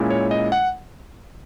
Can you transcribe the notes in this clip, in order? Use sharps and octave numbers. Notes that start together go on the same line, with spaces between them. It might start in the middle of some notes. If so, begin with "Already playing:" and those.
Already playing: A#2 G#3 C#4 E4
C#5
D#5
F#5